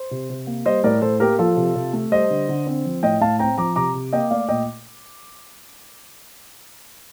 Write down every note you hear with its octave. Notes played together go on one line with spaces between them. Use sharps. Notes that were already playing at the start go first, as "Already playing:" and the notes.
Already playing: C5
C3
C3
A#3
G3 C5 D#5
A2 A#4 D5
A2 A4 C5
A#3 G4 A#4
F3 F4 A4
C3
C3
A3
G3 C5 D#5
D3
D3
C4
F3
A2 D#5 G5
A2 F5 A5
C4 G5 A#5
F3 A#5 D6
C3 A#5 D6
C3
A#3 D#5 G5
A3 D5 F5
A#2 D#5 G5